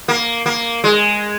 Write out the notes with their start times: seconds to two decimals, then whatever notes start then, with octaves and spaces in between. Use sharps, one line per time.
0.08 A#3
0.46 A#3
0.84 G#3